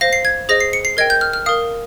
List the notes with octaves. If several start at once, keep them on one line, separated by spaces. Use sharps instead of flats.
C5 F5 A#6
C7
G#6
G#4 C5 D#5 A#6
C7
C#7
C7
A#4 D#5 G5 G#6
G6
F6
F6
A#4 F5 D#6